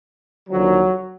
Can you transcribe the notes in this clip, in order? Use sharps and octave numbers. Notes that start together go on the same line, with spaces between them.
D#2 D3 F3 F#3